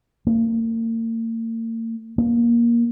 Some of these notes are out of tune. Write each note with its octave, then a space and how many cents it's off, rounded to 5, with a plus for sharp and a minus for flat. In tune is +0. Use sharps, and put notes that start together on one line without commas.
A#3 -40
A#3 +15